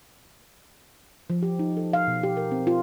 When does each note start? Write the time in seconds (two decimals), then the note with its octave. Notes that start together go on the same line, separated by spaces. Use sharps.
1.30 F3
1.43 G4
1.59 D#4
1.77 A4
1.93 F5
2.07 B2
2.23 G4
2.37 A#4
2.52 C4
2.67 F4